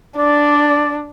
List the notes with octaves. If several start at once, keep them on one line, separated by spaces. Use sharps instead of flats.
D4 D5